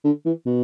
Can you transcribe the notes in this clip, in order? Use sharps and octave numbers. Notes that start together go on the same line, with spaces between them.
D3
E3
B2